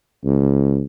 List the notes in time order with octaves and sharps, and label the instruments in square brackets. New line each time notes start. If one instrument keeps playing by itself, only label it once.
[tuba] C#2